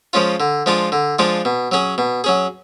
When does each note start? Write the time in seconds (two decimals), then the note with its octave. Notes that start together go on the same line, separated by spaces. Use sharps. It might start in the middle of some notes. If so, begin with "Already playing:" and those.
0.13 F3 G#3 C#4 F4
0.40 D3
0.66 F3 G#3 D4 F4
0.92 D3
1.19 F3 G#3 D4 F4
1.45 B2
1.71 F#3 C#4 G#4
1.98 B2
2.24 F#3 C#4 G#4